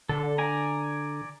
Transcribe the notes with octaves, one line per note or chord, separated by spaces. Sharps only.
D3 A4
D5 G#5 A#5